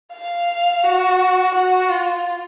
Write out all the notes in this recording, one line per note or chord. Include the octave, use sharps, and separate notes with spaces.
F5
F#4
F#4
F4